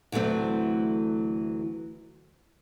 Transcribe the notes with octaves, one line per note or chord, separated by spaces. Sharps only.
D2 E3 F#3 A3 C4